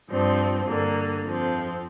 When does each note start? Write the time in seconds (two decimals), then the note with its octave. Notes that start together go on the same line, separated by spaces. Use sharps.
0.10 G2 F3 C4
0.67 G2 D3 A#3
1.24 F2 F3 C4